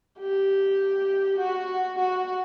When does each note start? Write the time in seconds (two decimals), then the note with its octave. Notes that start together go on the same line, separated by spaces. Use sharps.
0.19 G4
1.38 F#4
1.98 F#4